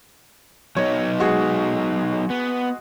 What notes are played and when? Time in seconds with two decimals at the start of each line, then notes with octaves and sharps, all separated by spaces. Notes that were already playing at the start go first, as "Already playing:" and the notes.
0.77 F#3 B3 D#4 C#5
1.19 G#3 F#4 G#4
2.30 B3